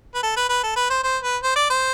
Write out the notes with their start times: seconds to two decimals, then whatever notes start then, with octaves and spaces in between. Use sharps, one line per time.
0.15 B4
0.23 A4
0.37 B4
0.49 B4
0.64 A4
0.77 B4
0.90 C5
1.04 C5
1.23 B4
1.43 C5
1.56 D5
1.70 C5